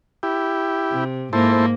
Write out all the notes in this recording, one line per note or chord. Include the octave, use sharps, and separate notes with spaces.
E4 G4
C3
G#2 A#3 E4 A4 C5